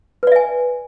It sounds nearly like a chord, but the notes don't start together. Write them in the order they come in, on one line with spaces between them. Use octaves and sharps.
B4 D5 E5 G#5